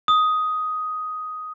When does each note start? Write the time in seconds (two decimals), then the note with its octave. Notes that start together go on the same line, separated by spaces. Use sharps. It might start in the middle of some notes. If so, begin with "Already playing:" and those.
0.08 D#6